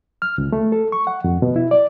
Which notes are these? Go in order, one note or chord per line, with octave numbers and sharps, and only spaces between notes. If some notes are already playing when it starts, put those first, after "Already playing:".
F6
C#2
A3
A4
C#6
F#5
F2
B2
E4
D5